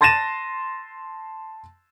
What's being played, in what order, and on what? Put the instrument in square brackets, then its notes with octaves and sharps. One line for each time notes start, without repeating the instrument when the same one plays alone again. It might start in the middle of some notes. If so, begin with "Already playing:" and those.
[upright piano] A5 C6 A6 A#6 D#7 E7